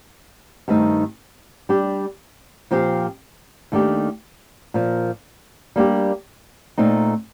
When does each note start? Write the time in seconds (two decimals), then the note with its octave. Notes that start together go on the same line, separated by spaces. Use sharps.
0.68 G2 D#3 A3 C4 D#4
1.69 G3 D4 G4
2.71 A#2 F3 C4 G4
3.72 D#2 D#3 A3 D4 G4
4.74 A#2 F3 A#3
5.76 G3 A#3 D4 G4
6.78 A#2 A3 C4 D#4